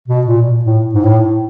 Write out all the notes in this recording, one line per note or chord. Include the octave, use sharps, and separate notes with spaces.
B2
A#2
A2
G#2
A2